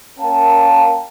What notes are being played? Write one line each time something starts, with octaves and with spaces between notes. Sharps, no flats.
A#3 C#4 A#4 F5 G5 A5